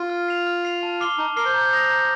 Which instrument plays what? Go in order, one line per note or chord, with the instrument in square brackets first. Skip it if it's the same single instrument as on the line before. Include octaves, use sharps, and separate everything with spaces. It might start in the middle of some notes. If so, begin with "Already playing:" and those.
Already playing: [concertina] F4
[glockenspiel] F6
C7 F7
F6
C7 F7
A5
D6 F6 C7 G7
[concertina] D#4 [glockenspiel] A5
[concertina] A#4 [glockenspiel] D6 F6 C7 G7
[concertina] C5
[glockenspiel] A#5
D#6 A#6 F7
A#5